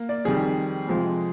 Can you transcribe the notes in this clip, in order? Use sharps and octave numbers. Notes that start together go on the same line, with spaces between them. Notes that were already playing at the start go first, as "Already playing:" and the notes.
Already playing: A#3
D5
F2 D#3 G3 G#4
F2 C3 F3 G#3